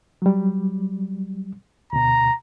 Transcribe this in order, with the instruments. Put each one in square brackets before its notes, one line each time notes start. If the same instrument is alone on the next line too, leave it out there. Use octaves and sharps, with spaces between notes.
[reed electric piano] F#3 G3
[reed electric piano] D2 B2 [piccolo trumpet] A#5